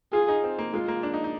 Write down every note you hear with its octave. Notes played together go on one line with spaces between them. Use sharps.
F4 G#4
D#4
C4
A#3
G#3 F4
A#3
D4
D#4
D#4